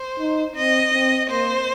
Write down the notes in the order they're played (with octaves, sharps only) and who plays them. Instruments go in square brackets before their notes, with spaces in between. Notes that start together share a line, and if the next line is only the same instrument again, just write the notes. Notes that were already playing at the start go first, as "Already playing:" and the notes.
Already playing: [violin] C5
[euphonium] D#4
[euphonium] C4 [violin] D#5
[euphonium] C4
[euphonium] A#3 [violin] C5